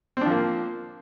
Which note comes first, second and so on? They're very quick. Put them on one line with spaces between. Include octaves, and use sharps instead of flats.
C4 D4 F3 A#3